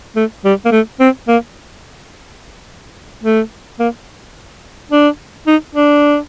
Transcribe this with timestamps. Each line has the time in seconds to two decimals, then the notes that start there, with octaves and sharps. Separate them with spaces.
0.16 A3
0.45 G3
0.65 A#3
0.72 A3
1.00 C4
1.28 A#3
3.24 A3
3.80 A#3
4.92 D4
5.47 D#4
5.75 D4